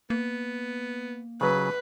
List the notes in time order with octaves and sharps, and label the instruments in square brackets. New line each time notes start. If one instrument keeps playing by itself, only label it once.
[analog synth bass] A#3 [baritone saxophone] B3
[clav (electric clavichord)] C#3 F#3 [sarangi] B4